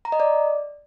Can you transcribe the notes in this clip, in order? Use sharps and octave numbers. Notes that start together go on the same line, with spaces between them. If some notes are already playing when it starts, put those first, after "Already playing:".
A#5
D#5
D5